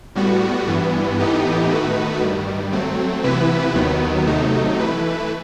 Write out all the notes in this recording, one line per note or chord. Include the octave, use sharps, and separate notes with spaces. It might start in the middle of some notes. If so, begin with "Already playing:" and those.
A2 G3 B3 F#4
G2 E3 B3
A2 E3 B3 D#4 G4
D#3 A3 D#4 F#4 B4
G2 D#3 G3
F#3 A3 C4
C3 E3 B3 E4 B4
D#2 D#3 F#3 B3
C3 F#3 A3 D#4
E3 A3 E4 B4